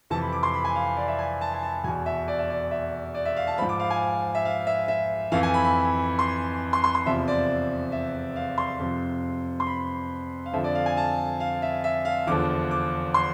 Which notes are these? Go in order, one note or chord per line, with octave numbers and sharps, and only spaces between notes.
F2 C3 E3 A5
B5
D6
C6
B5
G#5
F5
D5
E5
G#5
A5
G#5
A5
E2 B2 G#5
E5
D5
E5
D5
E5
D5
E5
F5
A5
G#2 F3 B5
D6
F5
G#5
E5
F5
E5
E5
F2 E3 F5
G#5
B5
B5
C6
C6
C6
C6
E2 C3 F3 E5
D5
E5
F5
C6
F2 C3 F3
C6
B5
F5
F2 D3 F3 E5
D5
F5
G#5
A5
F5
E5
E5
F5
E2 D3 F3 D6
D6
C6